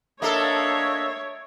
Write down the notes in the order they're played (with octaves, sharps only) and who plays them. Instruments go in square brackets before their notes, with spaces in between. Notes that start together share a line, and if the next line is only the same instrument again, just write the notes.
[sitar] A#3 A4 [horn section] D4 D#5 E5 [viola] C#5